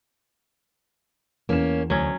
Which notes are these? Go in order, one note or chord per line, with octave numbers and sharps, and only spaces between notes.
E2 A#3 C#4 E7
D2 F#3 C#4